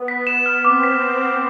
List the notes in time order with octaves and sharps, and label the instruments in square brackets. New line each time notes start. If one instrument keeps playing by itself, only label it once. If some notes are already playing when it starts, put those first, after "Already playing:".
Already playing: [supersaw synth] B3
[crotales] B6
E7
F6
[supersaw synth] C4 [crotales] D6
[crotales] B6
E7
F6